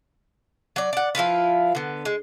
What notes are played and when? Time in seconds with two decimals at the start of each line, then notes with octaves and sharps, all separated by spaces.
0.76 F#3 D5
0.93 D5 F#5
1.15 F3 E4 F4 B4
1.75 D3 B3
2.05 G#3